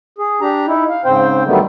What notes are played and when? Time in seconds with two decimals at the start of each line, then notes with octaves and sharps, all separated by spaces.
0.18 G#4
0.41 D4 G4 A#5
0.67 D#4 E4
0.89 F5
1.05 G#2 C#3 C4 C5 G5
1.46 D3 D#3 F#3 G3 A3 B3